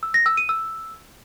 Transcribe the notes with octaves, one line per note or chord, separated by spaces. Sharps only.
E6
A#6
E6
D#7
E6